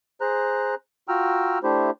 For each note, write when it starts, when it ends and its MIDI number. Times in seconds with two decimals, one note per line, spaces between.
0.21 0.75 68
0.21 0.75 72
0.21 0.75 82
0.21 0.75 90
1.09 1.59 65
1.09 1.59 66
1.09 1.59 79
1.09 1.59 82
1.09 1.59 88
1.09 1.59 89
1.63 1.91 57
1.63 1.91 62
1.63 1.91 64
1.63 1.91 67
1.63 1.91 72